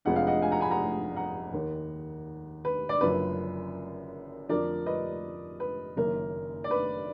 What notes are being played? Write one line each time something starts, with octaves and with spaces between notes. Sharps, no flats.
F1 F2 F3 G#3 D4 F#5
F5
D#5 F#5
F5 G#5
F#5 A#5
G#5 B5
F#5 A#5
F#5 A#5
D#2 D#3 A#3
B4
D5
F#1 F#2 D3 F3 B4
F2 D3 F3 A#4 D5
B4 D#5
B4
F#1 F#2 D#3 A#3 A#4
D5
B4